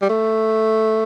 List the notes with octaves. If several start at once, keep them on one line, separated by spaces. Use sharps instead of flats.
G3
A3